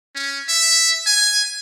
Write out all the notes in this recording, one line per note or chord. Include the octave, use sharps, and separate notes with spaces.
C#4
E5
G#5